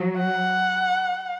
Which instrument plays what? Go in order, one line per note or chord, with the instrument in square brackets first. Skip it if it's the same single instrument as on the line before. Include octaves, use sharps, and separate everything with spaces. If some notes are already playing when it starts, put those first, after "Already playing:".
Already playing: [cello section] F#3
[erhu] F#5